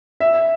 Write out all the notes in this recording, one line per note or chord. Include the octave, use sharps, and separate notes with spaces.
E5